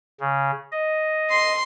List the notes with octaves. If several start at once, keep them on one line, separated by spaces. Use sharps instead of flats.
C#3
D#5
C6 C7